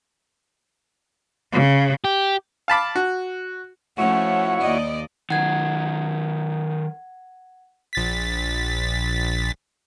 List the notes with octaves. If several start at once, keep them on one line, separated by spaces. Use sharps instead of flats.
C#3
G4
F5 A5 B5 D6
F#4
F3 A3 C#4 E4 F#4 C#5 F#5
D#2 D5 D#5
D#3 F#3 F#5 G#6
A#1 A6 B6